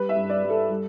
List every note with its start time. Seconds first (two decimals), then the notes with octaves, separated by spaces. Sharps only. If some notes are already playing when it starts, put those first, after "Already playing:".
Already playing: G3 B4
0.09 E5
0.16 G2
0.29 D5
0.43 G3
0.50 A4
0.70 G3